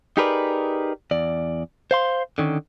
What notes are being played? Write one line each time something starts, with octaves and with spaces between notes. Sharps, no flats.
D#4 G4 G#4 A#4 B4 D5
E2 D5
C5 F5 C6
D3 D#3 C#4